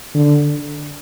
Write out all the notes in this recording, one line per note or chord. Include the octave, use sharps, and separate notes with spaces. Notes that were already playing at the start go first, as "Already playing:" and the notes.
D3